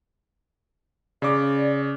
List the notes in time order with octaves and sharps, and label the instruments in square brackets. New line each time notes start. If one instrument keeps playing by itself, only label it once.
[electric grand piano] C#3 D6 [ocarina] D5